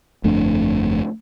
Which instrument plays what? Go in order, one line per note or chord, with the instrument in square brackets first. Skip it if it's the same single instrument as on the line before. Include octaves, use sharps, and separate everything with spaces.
[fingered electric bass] G1 F2 A3 D4